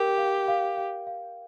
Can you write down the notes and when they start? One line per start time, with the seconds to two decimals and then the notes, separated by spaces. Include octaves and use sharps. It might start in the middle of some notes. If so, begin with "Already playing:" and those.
Already playing: G4 A#4 F5
0.18 F5
0.48 F5
0.77 F5
1.07 F5